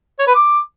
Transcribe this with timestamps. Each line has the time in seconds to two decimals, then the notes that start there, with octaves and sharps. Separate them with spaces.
0.19 C#5
0.27 B4
0.35 D6